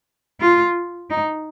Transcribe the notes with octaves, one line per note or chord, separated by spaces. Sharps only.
F4
D#4